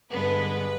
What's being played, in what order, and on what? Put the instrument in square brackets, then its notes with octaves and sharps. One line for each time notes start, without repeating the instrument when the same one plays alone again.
[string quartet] G2 D3 G#3 B3 B4